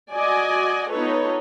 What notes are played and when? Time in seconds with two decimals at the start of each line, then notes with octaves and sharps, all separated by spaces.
0.11 F#4 D5 D#5 G#5
0.90 B3 D#4 F4 A4 B4 C#5